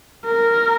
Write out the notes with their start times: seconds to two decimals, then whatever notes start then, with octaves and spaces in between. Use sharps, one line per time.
0.25 A#4